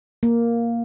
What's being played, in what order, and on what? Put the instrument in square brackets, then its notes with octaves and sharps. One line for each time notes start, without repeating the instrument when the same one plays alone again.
[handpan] A#3